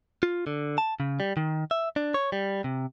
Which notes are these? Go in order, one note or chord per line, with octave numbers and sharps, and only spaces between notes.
F4
D3
A5
C#3
G3
D#3
E5
D4
C#5
G3
C3